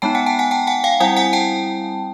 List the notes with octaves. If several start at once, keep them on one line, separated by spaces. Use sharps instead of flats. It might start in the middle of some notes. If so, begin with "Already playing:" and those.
G#3 B3 D#4 G5 A5
F#5 G#5
G5 A5
F#5 G#5
G5 A5
F#5 G#5
F5 G5
G3 C4 E4 F#5 G#5
F#5 G#5
G5 A5